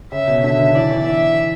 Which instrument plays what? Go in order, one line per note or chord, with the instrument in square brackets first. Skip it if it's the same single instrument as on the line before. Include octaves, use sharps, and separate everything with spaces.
[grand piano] C#3 [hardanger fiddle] E5
[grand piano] B2
[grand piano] D3 [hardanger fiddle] E5
[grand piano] D3
[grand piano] E3 [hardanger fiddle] D5
[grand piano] E3
[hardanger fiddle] E5